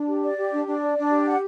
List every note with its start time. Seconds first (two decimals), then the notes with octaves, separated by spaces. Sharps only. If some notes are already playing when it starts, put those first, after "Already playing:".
Already playing: D4
0.08 G4
0.22 D5
0.37 G4
0.52 D4
0.67 D4
0.82 D5
0.97 D4
1.12 G4
1.27 F#5